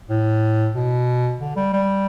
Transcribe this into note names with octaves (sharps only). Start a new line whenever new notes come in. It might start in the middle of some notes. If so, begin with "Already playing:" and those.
A2
B2
D3
G3
G3